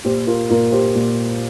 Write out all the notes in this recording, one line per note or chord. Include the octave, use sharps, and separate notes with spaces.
A#2 G4 C5
F4 A#4
A#2 F4 A#4
G4 C5
A#2